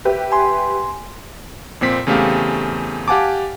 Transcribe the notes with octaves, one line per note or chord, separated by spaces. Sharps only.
G4 B4 E5
G#5 C6
F2 A#2 C4 B6
E2 C#3 A3 C4 G4 F5
G4 F5 F#5 G#5 A5 D6